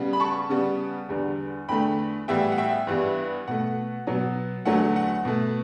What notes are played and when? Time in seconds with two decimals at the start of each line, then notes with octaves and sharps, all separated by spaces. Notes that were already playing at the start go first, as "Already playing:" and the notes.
Already playing: C#3 G3 B3
0.13 B5
0.20 A5 C#6
0.49 C#3 G3 B3
1.09 E2 D3 G3 B3
1.68 E2 D3 A3 G5 B5
2.28 A2 E3 G3 B3 E5 G5
2.52 F#5
2.58 E5 G5
2.87 G2 E3 G3 B3
3.48 B2 A3 F#5
4.07 B2 F#3 B3
4.65 E2 D3 F#3 A3 F#5
4.96 F#5
5.25 B2 A3